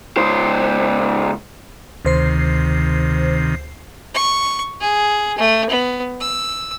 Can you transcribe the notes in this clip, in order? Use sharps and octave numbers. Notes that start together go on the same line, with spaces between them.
C#2 C5
D2 C3 D#3 C5 C7
C#6
G#4
A3
B3
E6